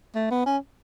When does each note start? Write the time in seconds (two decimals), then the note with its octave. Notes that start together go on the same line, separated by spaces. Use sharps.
0.15 A3
0.31 B3
0.46 C#4